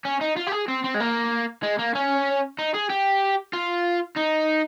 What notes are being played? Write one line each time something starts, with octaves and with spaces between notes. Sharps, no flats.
C#4
D#4
F4
G4
G#4
C4
C4
G#3
A#3
G#3
A#3
C#4
D#4
G#4
G4
F4
D#4